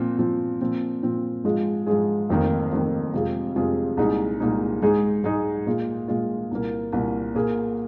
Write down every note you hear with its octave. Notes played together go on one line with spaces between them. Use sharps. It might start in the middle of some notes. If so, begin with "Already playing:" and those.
Already playing: A#2 F3 C4
A#2 F3 C4
A#2 F3 C4
A#2 F3 C4
G#2 F3 G#3 F4 G#4
G#2 F3 G#3 F4 G#4
F1 F2 D#3 A#3
F1 F2 D#3 A#3
F2 C3 G#3 F4 G#4
F2 C3 G#3 F4 G#4
C2 A#2 G#3 D#4 G#4
C2 A#2 G#3 D#4 G#4
G#2 G#3 D#4 G#4
G#2 G#3 D#4 G#4
A#2 G#3 F4
A#2 G#3 F4
C2 A#2 A#3
C2 A#2 A#3
A#2 A#3 G#4